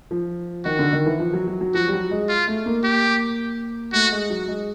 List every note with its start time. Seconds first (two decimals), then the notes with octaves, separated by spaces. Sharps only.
0.11 F3
0.65 D#3 F#4
0.79 D3
0.93 D#3
1.06 E3
1.19 F3
1.33 F#3
1.47 F#3
1.61 F#3
1.74 F3 F#4
1.88 G3
1.93 F#3
2.11 G#3
2.29 F4
2.48 A3
2.66 A#3
2.83 G4
3.93 A3 F#4
4.12 G#3
4.30 F#3
4.48 G#3